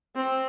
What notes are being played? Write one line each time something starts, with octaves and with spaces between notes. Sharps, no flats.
C4